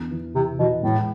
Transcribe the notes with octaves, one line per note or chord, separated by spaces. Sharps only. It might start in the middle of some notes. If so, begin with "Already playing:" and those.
Already playing: E2 D4
E3
C3 E3
B2 E3
A2 G#3